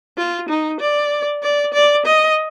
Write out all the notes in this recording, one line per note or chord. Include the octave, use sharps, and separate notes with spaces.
F4
D#4
D5
D5
D5
D#5